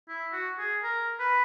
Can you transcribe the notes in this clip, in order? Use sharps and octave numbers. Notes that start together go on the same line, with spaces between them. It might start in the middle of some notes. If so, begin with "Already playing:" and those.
E4
F#4
G#4
A#4
B4